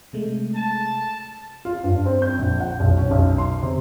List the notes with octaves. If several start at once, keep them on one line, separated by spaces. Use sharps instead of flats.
C3 G#3 A3
A5
F4
G2
C4
G6
A#1
F#5
B1
C#4
B1
C6
C3